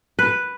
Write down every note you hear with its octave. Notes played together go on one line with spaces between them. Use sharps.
B4